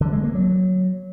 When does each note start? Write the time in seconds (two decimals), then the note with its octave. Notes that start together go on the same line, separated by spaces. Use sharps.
0.01 D3
0.12 G#3
0.24 A#3
0.35 F#3